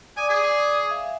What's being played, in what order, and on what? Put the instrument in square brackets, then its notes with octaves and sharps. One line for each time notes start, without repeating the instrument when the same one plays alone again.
[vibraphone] D5 D6 D#6 [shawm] G#5
[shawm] G#4
[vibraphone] E5 F5 G#5